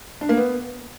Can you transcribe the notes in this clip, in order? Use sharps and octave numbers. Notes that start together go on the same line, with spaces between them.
D4
A#3
B3